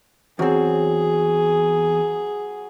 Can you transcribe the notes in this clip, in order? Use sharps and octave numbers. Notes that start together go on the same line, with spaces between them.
E2 F#3 C4 G#4